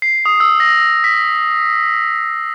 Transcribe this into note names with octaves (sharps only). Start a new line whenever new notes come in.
C7
D#6
E6
A#6
B6